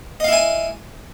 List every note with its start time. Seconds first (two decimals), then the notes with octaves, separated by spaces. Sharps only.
0.20 D#5
0.24 F5
0.28 E4
0.33 G#5